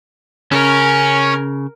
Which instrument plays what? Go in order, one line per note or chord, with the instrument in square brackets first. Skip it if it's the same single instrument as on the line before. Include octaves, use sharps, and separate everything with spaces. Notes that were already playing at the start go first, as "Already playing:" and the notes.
[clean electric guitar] C#3 [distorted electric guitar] C#4 [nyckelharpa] A#4